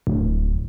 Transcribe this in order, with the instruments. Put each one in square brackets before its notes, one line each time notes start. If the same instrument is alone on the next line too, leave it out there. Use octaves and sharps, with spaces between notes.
[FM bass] D1